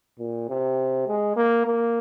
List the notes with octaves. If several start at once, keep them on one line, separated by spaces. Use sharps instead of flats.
A#2
C3
G#3
A#3
A#3